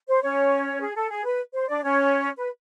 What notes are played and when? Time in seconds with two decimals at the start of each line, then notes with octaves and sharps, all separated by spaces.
0.08 C5
0.22 C#4 C#5
0.80 G#4
0.96 A4
1.10 G#4
1.25 B4
1.54 C5
1.68 D4 D5
1.83 C#4 C#5
2.38 B4